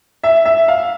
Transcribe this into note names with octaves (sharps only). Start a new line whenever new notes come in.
E5
E5
F5